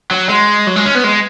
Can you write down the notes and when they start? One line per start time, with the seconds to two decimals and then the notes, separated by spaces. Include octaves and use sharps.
0.11 F#3
0.29 G#3
0.67 F#3
0.76 G#3
0.86 C#4
0.95 B3
1.04 G#3